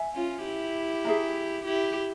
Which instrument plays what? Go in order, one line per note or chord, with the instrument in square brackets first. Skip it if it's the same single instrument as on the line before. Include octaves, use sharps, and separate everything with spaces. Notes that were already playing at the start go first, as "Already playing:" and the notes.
Already playing: [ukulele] E5 G#5
[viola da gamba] C#4 F4
E4 G4
[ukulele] G#4 E5 A#5
[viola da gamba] E4 G4